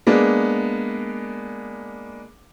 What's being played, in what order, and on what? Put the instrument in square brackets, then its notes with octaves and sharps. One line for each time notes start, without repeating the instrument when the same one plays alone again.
[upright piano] G#3 A#3 B3 D4